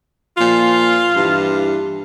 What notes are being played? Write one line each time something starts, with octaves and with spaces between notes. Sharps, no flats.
A#2 F3 F4
G2 E3